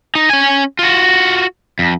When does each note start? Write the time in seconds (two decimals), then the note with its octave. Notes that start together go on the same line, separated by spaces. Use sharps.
0.15 D#4
0.30 C#4 G#5
0.79 F4 F#4
1.79 F2